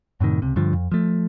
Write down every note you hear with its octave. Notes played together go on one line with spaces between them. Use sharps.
F#2 A2 C3 D#3
C#2 C3
G2 D3 F3
F2
F3 A3